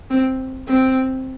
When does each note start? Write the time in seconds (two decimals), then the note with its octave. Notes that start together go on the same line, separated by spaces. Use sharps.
0.10 C4
0.68 C4